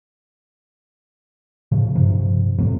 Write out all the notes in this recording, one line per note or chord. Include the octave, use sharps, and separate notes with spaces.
A2 C#3 F3
G2 C3 F3
G1 F2 A2 C3